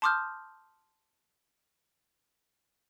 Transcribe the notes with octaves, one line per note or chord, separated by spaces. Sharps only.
A5 C6 D6 D#6 F6 G6